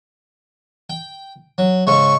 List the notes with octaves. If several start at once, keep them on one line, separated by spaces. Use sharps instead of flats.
G5
F#3
G#2 C#3 G#3 C#6